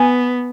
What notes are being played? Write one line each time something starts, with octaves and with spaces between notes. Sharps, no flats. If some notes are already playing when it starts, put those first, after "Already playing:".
Already playing: B3 G#5